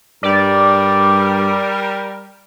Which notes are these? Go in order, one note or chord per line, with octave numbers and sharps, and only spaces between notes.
G2 G3 A#4 D5